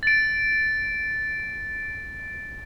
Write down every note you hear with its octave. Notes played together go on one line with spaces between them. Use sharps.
A6 D7